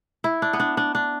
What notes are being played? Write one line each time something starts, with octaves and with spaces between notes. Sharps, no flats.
E4
D4
B3
D4
D4
D4